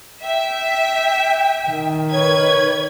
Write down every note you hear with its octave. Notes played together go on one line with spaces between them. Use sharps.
E5 G5
D#3
B4 C#5 G#6